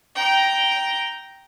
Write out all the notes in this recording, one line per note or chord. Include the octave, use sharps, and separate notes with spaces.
G5 A#5